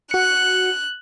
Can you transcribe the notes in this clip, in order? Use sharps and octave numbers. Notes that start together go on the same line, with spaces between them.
F#4 F#6 C#7